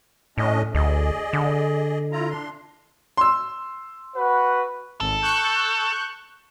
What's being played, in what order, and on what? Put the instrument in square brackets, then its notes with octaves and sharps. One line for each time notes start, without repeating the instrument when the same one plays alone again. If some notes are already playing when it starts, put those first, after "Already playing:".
[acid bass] A2 [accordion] C#4 D4 D#5
[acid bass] D2 [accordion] G#4 D5 D#5
[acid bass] D3
[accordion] E4 F4 A#5
D4 C6
[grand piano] C6 E6
[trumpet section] F#4 B4 F#5
[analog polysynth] G#1 [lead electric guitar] A4
[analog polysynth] C#6 F#6 G6